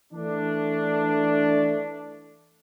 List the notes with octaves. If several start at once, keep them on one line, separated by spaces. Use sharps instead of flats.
E3 A3 D4